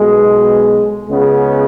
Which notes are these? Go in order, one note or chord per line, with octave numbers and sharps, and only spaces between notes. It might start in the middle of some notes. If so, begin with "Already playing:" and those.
Already playing: B1 B2 G#3
C#2 C#3 G#3 B3